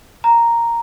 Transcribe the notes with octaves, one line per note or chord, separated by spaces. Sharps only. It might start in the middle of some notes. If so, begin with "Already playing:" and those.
A#5